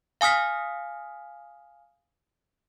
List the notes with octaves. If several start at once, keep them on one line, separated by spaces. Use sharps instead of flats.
F5 G#5 D#6 F6 B6